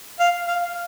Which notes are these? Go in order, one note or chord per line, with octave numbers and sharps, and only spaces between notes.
F5
F5